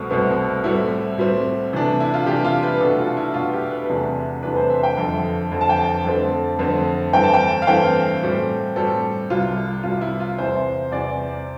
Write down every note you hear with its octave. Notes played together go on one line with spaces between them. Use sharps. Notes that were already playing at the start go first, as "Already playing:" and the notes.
Already playing: C2 B2 A3 C4
C2 B2 A3 C4
A2 G3 C4 E4
A2 G3 C4
C3 E3 A3 D4
E4
F4
C3 E3 A3 D4 G4
F4
B4
B2 A3 D4 A4
F4
E4
B2 A3 D4 F4
G4
B4
E2 C3 E3 A3 D4
E2 C3 E3 A3 D4 B4
C5
E5
G5
F2 D3 F3
F2 D3 F3
A5
G5
A5
F2 D3 A3 C4
F2 D3 A3 C4
G2 E3 A3 C4 G5
A5
G5
F5
G2 E3 A3 C4 G5
A2 G3 C4
A2 G3 C4 A4
C2 C3 G3 F4
C2 C3 G3 F4
E4
F4
E2 C3 E3 C5
E2 C3 E3 D5